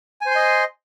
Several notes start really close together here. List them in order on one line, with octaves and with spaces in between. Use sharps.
G#5 C5 C6 D#5